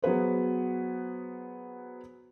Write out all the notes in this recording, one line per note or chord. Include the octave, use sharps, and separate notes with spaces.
F#3 B3 G#4 B4 C5